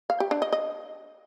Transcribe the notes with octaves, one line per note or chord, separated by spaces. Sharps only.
F5
G4
D4
D#5
D#5